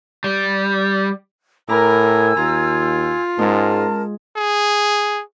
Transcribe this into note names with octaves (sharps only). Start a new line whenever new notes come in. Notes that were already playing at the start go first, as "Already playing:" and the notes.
G3
A2 A#4 G#5 A#5 B5 D6 E6 G#6
D#2 F4 A#5
G#2 G#3 C#4 A#4 A5
G#4